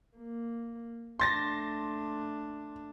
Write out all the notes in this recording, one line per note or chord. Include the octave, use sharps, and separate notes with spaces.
A#3
A3 D4 C6 A6 A#6